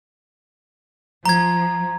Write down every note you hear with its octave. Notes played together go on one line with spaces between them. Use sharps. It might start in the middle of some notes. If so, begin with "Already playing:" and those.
F3 A#5 G#6